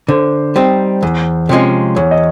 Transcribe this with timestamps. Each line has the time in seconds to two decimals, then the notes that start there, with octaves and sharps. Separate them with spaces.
0.08 D3 C5
0.56 G3 C4 D#4
1.03 E2
1.49 C3 F3 G#3 C#4
1.96 E2 C#5
2.11 D#5